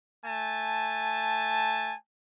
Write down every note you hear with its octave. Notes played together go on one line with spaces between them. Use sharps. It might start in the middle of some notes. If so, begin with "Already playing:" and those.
A3 G#5 A5